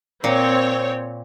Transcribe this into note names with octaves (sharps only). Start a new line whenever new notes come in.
A#2 C4 C#5